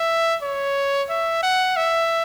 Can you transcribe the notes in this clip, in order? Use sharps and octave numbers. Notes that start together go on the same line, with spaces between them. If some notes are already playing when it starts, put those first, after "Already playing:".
Already playing: E5
C#5
E5
F#5
E5